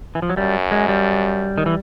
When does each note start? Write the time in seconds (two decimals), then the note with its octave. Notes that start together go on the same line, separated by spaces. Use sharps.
0.15 E3
0.22 F3
0.30 F#3
0.37 F#2 G3
0.71 G#3
0.89 G3
1.58 D#3
1.66 E3